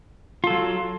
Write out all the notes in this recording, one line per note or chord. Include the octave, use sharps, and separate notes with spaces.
F#3 F4 A4